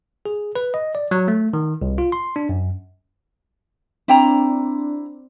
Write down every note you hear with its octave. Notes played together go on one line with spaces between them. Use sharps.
G#4
B4
D#5
D5
F#3
A3
D#3
C2
F4
C6
D4
F#2
C4 D4 E4 G5 A#5